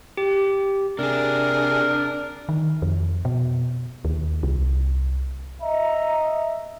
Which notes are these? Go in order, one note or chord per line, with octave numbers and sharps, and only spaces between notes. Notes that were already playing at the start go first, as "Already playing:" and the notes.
G4
C3 D4 G#4 A#4
D#3
F2
B2
D#2
C2
D#5 E5 A#5